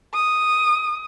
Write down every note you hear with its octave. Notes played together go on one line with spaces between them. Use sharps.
D#6